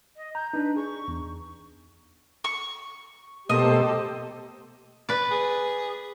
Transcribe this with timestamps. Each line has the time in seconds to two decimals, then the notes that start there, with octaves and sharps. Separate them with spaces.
0.17 D#5
0.35 A#5 G6
0.53 D4 D#4 B4
0.76 G#4 C#6
1.08 E2
2.44 C#6
3.49 B2 A3 A#3 G4 A4 C5 D#5
5.09 B4 D5
5.31 G#4